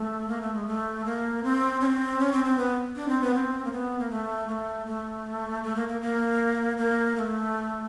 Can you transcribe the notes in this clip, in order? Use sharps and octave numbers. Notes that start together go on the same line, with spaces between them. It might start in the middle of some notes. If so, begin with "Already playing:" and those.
Already playing: A3
A#3
A3
G#3
A3
A#3
C4
C#4
C4
C#4
C4
C4
B3
D4
C4
B3
C4
A#3
B3
A#3
A3
A#3
A3
A3
A3
A#3
A#3
A#3
A#3
A#3
A3